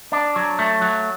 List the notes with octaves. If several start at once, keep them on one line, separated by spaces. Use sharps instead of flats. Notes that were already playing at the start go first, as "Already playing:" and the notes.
D4
F#3
A3
F#3